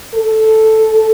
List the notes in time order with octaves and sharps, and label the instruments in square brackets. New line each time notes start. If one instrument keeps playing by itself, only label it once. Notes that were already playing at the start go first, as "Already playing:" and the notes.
[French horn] A4